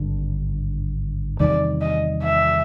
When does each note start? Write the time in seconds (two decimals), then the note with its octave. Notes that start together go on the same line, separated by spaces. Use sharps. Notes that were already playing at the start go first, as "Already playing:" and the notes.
Already playing: G#1 G2 D3
1.40 E2 C3 D#3 G3 D5
1.81 D#5
2.23 E5